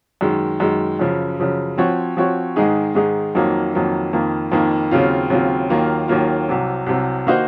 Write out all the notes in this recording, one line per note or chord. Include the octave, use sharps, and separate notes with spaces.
F#2 D#3 G#3
F#2 D#3 G#3
F#2 C#3 F3
F#2 C#3 F3
F3 C4 F#4 C#5
F3 C4 F#4 C#5
G#2 D#3 G#3 D#4 G#4
G#2 D#3 G#3 D#4 G#4
F2 D#3 F#3 A#3
F2 D#3 F#3 A#3
F2 D#3 A#3
F2 D#3 A#3
D#2 C#3 F#3 C4 F4
D#2 C#3 F#3 C4 F4
D#2 D#3 F#3 A#3 F4
D#2 D#3 F#3 A#3 F4
C2 C3 F#3
C2 C3 F#3
D#3 A#3 D#4 F#4 C5